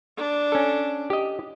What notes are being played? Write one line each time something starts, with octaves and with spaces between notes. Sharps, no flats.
D4
C#4 A4
G4 D#5